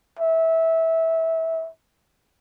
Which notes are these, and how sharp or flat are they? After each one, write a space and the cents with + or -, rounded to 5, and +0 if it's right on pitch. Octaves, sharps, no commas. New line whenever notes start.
E5 -20